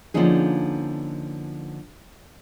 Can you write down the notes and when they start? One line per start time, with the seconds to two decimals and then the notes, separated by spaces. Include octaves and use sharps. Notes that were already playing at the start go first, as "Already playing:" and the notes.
0.14 D3 F3 A#3 C#4 D#4 G#4